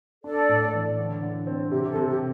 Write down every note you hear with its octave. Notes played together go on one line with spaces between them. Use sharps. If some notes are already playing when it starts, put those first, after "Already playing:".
D4 A4 D5
A2
E3
D3
D3
C4
C3 G4
G4
A4
C3
G4